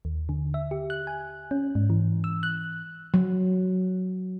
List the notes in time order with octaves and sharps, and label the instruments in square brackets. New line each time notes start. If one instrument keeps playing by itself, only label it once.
[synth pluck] D#2
D3
E5
G4
F#6
G#5
C#4
G#2
E3
E6
F#6
[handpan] F#3